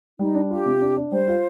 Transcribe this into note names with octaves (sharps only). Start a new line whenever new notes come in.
G3 D#4
D4
F4 G4
C3
D4
D4
G3 C5
F4